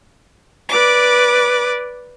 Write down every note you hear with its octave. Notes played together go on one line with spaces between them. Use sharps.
B4 D5 D6